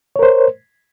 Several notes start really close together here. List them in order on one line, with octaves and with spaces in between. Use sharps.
C#5 A#4 C5